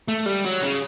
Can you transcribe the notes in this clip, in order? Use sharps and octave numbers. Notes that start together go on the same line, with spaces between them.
A3
G3
F#3
C#3